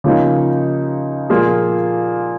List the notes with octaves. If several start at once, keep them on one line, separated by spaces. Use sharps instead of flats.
C#3 F3 A#3 D#4
A#2 F3 A#3 F4 G#4